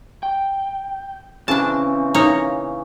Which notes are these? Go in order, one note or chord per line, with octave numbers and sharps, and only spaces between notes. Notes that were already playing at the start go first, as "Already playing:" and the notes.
G5
C#3 E3 C4 D4 A5
A#3 D#4 C#5